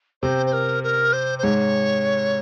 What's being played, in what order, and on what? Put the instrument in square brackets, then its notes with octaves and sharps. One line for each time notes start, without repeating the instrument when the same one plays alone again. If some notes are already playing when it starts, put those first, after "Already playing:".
[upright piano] C3 C4 [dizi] C5
[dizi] C5
A#4
A#4
C5
C5
[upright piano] G#2 G#3 [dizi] C#5